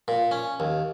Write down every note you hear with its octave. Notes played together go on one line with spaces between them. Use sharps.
A#2
C#4
D#2